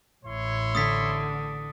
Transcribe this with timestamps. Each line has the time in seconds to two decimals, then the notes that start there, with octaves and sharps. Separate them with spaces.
0.25 A1 E4 C#5 C6
0.75 D3 D#6 A6 B6